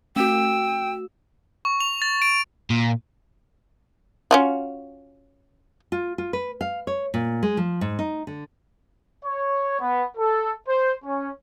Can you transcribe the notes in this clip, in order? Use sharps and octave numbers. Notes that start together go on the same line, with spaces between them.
A3 F#4 G5 E6
C#6
F7
A6
D7
A#2
C#4 F4 F#4
F4
F4
B4
F5
C#5
A#2
G#3
F3
G#2
D#4
D3
C#5
B3
A4
C5
C#4